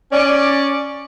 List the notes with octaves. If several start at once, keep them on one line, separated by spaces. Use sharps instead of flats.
C#4 D5